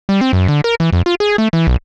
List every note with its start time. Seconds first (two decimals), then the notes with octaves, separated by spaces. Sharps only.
0.09 G3
0.21 C4
0.33 F#2
0.48 D3
0.64 A#4
0.80 E3
0.93 F2
1.06 F4
1.20 G#4
1.38 A3
1.53 E3
1.67 B1